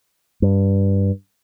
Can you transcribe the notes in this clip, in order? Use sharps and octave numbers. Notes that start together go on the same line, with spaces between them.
G2